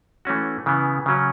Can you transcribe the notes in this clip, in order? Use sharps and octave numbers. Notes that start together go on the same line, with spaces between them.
E3 A3 C#4 F#4
C#3 E3 B3
C#3 F#3 C#4